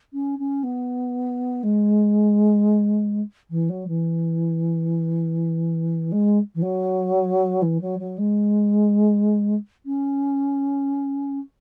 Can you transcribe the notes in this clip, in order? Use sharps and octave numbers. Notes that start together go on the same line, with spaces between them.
C#4
C#4
B3
G#3
E3
F#3
E3
G#3
E3
F#3
E3
F#3
F#3
G#3
C#4